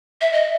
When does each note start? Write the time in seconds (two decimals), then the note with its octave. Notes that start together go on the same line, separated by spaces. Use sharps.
0.21 E5
0.33 D#5